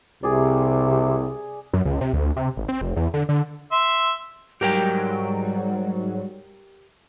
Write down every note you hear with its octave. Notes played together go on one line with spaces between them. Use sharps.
C2 C3 G#4 D5
F#2
C#2
C3
D2
C3
G#1
C4
F1
E2
D3
D3
E5 C6
G#2 F#3 G3 G4 A#4 G5